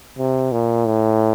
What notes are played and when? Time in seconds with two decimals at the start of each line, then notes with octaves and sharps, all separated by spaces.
0.18 C3
0.52 A#2
0.86 A2